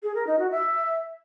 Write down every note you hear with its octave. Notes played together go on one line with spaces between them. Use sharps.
G#4
A#4
D#4
F#4
E5